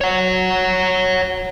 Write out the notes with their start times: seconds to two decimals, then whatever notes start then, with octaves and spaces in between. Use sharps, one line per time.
0.01 C#5 F#5